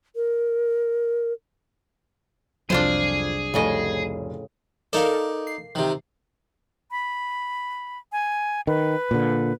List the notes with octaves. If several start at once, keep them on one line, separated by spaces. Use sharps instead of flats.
A#4
C2 F2 F#3 D4 F4 G#4 C5
F1 A2 C#3 D#5
D#4 A4 A#4 D5 F5
C7
C3 D#3
B5
G#5
D#3 B4
A#2 D3